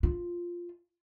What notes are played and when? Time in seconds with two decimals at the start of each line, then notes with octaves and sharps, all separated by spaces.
0.03 F4